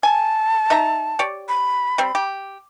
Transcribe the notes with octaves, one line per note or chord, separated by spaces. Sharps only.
G#5 A5
D#4 E5 A#5
G4 C#5 D5
B5
G3 C4
G4